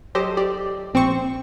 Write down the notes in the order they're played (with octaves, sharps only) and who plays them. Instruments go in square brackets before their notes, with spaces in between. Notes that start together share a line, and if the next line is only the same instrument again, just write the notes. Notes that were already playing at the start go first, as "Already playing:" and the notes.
[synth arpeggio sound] F#3 G4 A4 C5 D#5
G4 D5
A#1 C4 C5 C#6